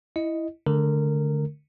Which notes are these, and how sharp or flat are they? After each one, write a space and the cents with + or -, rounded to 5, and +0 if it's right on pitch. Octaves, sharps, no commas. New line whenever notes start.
E4 +0 D#5 +0
D3 +0 A3 -25 A#4 -15